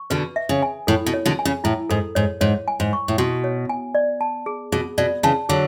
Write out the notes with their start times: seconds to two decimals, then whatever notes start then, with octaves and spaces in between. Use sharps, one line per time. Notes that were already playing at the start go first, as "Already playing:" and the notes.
Already playing: C#6
0.10 B2 D3 B4
0.36 E5
0.49 C#3
0.63 G#5
0.87 A2 A4
1.06 B2
1.14 C#5
1.26 B2 D3
1.39 G#5
1.45 C#3
1.64 A2 E4
1.90 G#2 A4
2.15 G#2 C#5
2.41 G#2 C#5
2.68 G#5
2.80 G#2
2.93 C#6
3.08 A2
3.18 B2 F#4
3.44 C#5
3.69 G#5
3.95 D5
4.21 A5
4.46 G#4
4.72 B2 G#4
4.98 B2 D5
5.23 C#3 E3 A5
5.49 D3 F#3 G#4